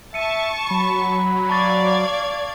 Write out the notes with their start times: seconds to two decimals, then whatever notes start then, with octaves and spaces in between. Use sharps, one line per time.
0.14 E5 A5 C#6 C#7 D#7
0.71 F#3 B5
1.50 D5 F5 A5 C#6 G#6 A6